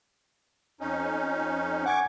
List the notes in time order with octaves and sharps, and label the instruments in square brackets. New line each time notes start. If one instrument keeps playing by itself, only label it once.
[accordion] F2 C#4 D#4
[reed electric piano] F#5 G#5 G#6 [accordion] C#6 D6